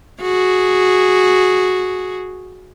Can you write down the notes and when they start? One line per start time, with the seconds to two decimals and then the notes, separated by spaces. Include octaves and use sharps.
0.22 F#4 G#4